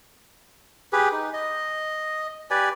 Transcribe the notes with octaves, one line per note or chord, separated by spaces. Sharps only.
G4 G#4 B4
D#4
D#5
G4 B4 D5 G#5